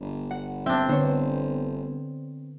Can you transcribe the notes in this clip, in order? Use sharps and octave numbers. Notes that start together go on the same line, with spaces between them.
G1
F#5
C4 D4 E5
D3 B3 C5 C#5